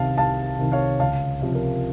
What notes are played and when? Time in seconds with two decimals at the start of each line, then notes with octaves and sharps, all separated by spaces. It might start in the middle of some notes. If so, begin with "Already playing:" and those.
Already playing: C2 C3 D#3 F5 A5
0.18 C2 F5 A5
0.59 C3 D#3
0.72 C#5 F5
0.99 C#2 F5 A5
1.42 C3 F3
1.55 A#4